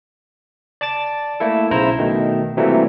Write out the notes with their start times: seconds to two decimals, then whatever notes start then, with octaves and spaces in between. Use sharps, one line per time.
0.81 D5 A5 D6 A6
1.40 A3 A#3 E4 A4
1.71 B1 C#3 E4 C5 A#5
1.98 B2 D#3 A3
2.57 C3 E3 F#3 G3 A3 A#3